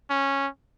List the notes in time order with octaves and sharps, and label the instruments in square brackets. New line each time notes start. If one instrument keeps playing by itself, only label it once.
[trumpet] C#4